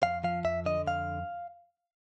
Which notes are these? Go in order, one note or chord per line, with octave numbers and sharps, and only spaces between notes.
F2 F5
F3 F5
F2 E5
D3 D#5
F2 F5